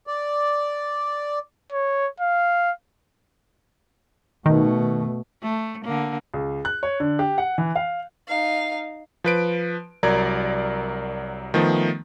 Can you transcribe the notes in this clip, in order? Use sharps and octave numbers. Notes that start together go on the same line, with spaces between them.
D5
C#5
F5
B2 D#3 A3
A3
D3 A#3
C#2
F#6
C#5
D3
G4
F#5
E3
F5
D#4 F5
F3 B4 D7
C2 F#3 A#4 D5 A#5 G#6
D#3 F3 A3 B3